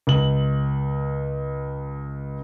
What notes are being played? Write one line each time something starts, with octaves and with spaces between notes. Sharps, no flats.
C#2 F#7